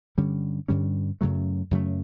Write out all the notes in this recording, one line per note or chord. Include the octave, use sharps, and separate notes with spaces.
G2 D3 G3 C#4
G2 D3 G3 C#4
F#2 C#3 F#3 A3
F#2 C#3 F#3 A3